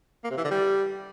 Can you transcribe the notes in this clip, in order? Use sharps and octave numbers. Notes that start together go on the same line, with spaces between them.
A#3
C3
E3
D3
G3